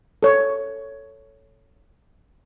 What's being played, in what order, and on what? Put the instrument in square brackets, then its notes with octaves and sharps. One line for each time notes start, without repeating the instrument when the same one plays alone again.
[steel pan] A4 C#5